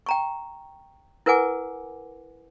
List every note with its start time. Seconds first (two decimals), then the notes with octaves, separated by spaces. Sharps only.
0.06 G5 A#5 C#6
1.26 E4 A#4 B4 F#5 G#5 D6